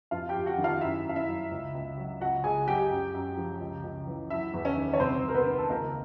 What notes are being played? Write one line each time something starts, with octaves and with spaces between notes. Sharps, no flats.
F2 F4 F5
G4 G5
F2
F#4 F#5
D#3
F4 F5
F#2 E4 E5
F#2 F5
E4 E5
F#3
C#2
C#2
F#3
C#2 F#4 F#5
C#2 G#4 G#5
F#3 G4 G5
F#2
F#2
F3
C#2
C#2
E3
F#3 E4 E5
E2
C#4 C#5
D#3
C#5
C2 C4 C5
C2
A#4
B3 B4
D#3
A4
C#2 A#3 A#4